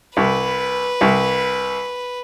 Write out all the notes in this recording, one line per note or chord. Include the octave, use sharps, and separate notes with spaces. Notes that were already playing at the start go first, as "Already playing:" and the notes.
C2 B4
C2